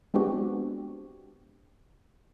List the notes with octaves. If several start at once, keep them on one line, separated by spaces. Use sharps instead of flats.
G#3 B3 C4 D4 F#4 G4